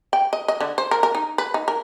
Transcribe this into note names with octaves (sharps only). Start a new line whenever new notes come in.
G5
D#5
D#5
D3
C5
A#4
A#4
D#4
B4
D#4
A#4